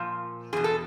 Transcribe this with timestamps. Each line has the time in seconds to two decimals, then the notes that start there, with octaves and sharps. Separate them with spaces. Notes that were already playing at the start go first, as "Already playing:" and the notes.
Already playing: A#2 F3
0.53 E2 B2 G#4
0.64 A4